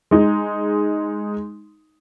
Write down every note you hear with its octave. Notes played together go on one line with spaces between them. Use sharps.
G#3 D#4